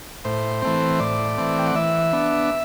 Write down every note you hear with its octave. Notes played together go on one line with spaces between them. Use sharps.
A2 C5
E3 A3 C4
A2 D5
E3 A3 C4
G5
F#5
E3 E5
B3 D4